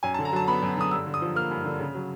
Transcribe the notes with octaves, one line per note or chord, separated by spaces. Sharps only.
F#2 G#5
A5
D3
A#5
F#3 A5
B3 B5
F#2
D3 D#6
G2 E6
D3
D#6
F3
A#3 F6
G2
D3
C#3
F#3